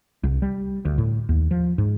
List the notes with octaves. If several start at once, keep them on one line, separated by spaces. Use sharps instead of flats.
C2
G3
D2
A2
D#2
F3
G#2